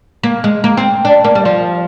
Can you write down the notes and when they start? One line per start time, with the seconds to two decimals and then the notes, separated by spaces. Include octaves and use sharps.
0.23 A#3
0.44 G#3
0.64 A#3
0.77 C4
1.05 D4
1.24 A#3
1.35 G3
1.45 F3